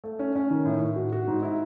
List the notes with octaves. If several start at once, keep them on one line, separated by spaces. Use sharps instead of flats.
A3
C#4
C#4
D#3
A2
A2
F#4
F#4
G#2
E4